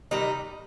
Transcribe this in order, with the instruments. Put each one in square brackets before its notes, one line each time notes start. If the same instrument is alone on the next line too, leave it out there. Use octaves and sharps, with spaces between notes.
[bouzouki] C3 D#3 G3 D#4